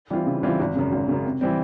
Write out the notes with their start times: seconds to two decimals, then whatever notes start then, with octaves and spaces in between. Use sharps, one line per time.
0.10 E3 G3 C4 F4
0.26 C#3
0.43 E3 G3 C4 F4
0.60 G#1
0.76 F#2 C#3
0.92 G#1
1.08 F#2 C#3
1.25 C3
1.41 E3 G3 C4